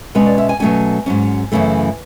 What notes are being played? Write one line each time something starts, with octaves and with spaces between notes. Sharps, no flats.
B2 G#3 C#4 B4
D5
E5
G#5
B2 F#3 A3 C#4 G#5
G#2 F#3 C#4
F#2 C#3 E3 A3